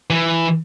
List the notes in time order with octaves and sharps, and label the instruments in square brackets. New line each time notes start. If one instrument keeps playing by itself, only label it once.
[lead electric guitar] E3